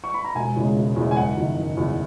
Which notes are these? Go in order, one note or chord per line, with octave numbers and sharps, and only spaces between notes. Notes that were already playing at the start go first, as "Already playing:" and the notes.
C#6
B5
A#5
E1 G#5
E2 C#3 G#3
E1
E2 C#3 G#3
G#5
F#1 F#5
E2 D#3
F#1
E2 D#3